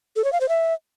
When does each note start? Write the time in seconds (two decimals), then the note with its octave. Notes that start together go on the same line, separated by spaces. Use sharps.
0.16 A4
0.24 C#5
0.33 F5
0.41 C5
0.49 E5